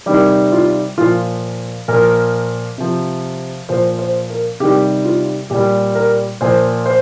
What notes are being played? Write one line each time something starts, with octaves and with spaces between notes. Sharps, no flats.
C3 D#3 G3 G4
F4
A#2 F3 F4
A#2 F3 A#4
C3 F3
A#2 F3 C5
C5
A#4
C3 D#3 G3 G4
F4
A#2 G3 G4
A#4
A#2 F3 C5
C5